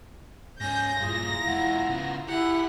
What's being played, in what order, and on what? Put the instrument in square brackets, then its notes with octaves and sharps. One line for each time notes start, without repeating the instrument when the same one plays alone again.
[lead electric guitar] G#2 C#4 [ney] G#5 [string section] G6 [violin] A#6
[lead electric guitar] G2 A#2 [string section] E4 F4 A#5 [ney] G#4
[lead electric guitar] E2 G#3 [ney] F#5
[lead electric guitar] C#3 B3
[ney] E4 [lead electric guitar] G4 G#4 [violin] F#5